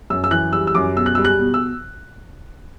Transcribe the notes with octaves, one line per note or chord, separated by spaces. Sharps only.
F#2 E6
E6
E3 F#6
G3 E6
E6
F#2 D6
B2 E6
F#6
G3 E6
F#6
B2
E6